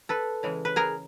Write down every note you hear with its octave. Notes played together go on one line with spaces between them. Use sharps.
A4 B4
C#3 E3 G#3
B4
G#4 A#4